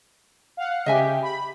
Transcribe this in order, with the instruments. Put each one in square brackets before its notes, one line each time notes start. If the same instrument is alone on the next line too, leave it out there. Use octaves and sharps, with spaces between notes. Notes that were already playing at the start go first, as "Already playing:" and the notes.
[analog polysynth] F5 F#5
[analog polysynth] C#3 G4 [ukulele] D#5 E5 G#5
[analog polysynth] B5